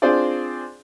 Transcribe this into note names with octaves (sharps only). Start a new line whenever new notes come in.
C4 D4 F4 G#4 C5 D5